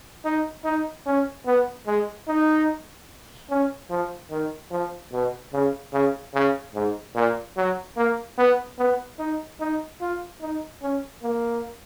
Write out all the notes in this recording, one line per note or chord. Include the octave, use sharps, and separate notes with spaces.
D#4
D#4
C#4
B3
G#3
D#4
C#4
F3
D#3
F3
B2
C#3
C#3
C#3
G#2
A#2
F#3
A#3
B3
B3
D#4
D#4
F4
D#4
C#4
A#3